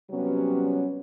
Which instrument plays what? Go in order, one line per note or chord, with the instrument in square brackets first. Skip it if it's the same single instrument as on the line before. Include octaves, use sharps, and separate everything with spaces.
[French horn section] C3 F#3 G3 B3 C#4